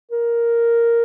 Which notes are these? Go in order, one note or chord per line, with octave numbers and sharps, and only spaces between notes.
A#4